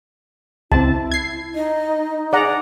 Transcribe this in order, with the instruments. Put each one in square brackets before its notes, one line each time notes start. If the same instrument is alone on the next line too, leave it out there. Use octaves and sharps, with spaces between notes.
[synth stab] C#2 C4 [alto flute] E4 [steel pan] A5
[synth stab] G#6 C7
[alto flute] D#4 [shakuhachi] D#5
[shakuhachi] G#4 [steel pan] D5 F#5 A#5